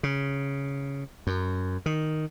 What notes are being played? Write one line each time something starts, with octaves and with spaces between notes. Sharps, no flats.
C#3
F#2
D#3